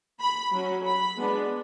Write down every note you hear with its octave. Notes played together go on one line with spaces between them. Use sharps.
B5
F#3 C#4
B5
G#3 B3 D4